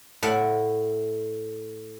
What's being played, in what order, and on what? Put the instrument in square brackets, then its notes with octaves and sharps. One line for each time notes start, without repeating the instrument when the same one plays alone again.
[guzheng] A2 E5 F#5